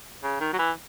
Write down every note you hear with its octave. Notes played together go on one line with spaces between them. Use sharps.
C#3
D#3
F#3
E3